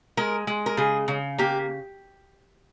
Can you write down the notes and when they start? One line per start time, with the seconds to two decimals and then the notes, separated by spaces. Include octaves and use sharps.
0.17 G#3 A#4
0.47 G#3
0.66 A#4
0.77 C#3 G#4
1.08 C#3
1.38 A#3 G4